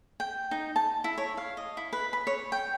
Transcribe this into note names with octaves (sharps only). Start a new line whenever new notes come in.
G5
D#4
A5
E4
C#5
F5
D#5
E4
B4
B5
C#5
G5